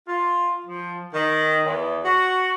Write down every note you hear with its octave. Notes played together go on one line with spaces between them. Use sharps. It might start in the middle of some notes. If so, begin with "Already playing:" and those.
F4
F3
D#3
E2
F#4